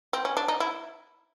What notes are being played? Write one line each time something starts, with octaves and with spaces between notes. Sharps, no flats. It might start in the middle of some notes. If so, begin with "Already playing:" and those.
C4
C#4
D4
D#4
E4